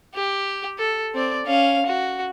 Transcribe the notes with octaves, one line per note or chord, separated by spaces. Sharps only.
G4
A4
C4 D5
C#4 F5
F#4